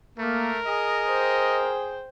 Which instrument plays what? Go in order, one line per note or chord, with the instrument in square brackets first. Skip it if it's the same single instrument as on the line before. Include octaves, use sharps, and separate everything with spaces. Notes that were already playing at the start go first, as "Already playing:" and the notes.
[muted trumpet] A3 [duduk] A#3 [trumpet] A#4
[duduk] G#4 [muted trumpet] D#5
[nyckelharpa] C5 G5